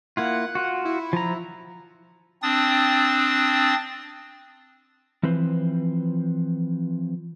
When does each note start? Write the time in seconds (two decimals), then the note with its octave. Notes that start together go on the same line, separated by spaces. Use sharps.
0.17 A#3 E4 F4 F#5
0.55 F4 F#4
0.85 E4
1.13 F3 A#5
2.42 C4 D4 D#6 A6
5.23 E3 F3 C4 B4 C5